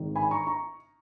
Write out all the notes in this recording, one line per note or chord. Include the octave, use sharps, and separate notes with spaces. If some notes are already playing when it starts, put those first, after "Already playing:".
Already playing: G#1 G#2 D#3
G#5 B5
A#5 C#6
A#5 C#6